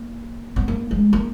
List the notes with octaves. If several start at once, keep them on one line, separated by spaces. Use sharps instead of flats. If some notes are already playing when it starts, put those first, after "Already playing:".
Already playing: A#3
B3
A#3
G#3
A#3